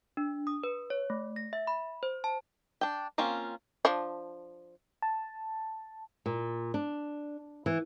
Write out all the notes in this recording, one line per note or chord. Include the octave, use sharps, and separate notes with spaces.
D4
D#6
B4
C#5
A3
A#6
E5
B5
C5
A5
D4 G5
A#3 C4 C#4 F4
F3 D4
A5
A#2
D4
E3